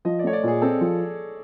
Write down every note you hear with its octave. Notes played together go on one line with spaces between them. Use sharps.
F3 D#5
D5
A3 C#5
D5
A#2 G#4
C4 A4
F3